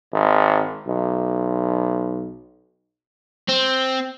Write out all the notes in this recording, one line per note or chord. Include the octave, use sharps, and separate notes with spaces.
G#1
B1
C4